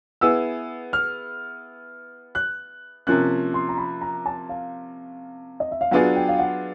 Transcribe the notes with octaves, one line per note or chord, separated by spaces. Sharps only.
B3 E4 G#4 E6
F6
F#6
C3 F3 A#3 C#4 F#6
C6
A#5
B5
A#5
A5
F5
D#5
E5
F5
F#3 B3 D4 F4 G#4 F#5
G5
F5
F#5